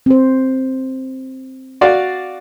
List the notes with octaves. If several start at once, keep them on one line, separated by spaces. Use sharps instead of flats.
C4 C5
F#4 D5 F5